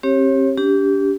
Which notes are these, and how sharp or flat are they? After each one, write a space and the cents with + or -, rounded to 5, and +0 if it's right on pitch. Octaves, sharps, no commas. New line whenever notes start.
C4 +45 G4 +0 C#5 -30
D4 -40 G4 +0